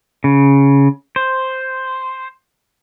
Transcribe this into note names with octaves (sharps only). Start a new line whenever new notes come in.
C#3
C5